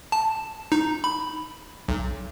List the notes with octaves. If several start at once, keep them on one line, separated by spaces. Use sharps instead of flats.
A5
D#4
B5
B1